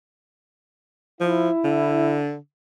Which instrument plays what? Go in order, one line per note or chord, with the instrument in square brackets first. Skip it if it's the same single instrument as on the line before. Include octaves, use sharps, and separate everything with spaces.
[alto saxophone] F3 [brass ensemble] E4
[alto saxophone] D3